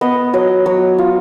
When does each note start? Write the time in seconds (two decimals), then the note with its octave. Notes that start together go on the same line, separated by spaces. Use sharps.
0.01 B3 D#5
0.33 F#3 D#5
0.66 F#3 C#5
0.98 F4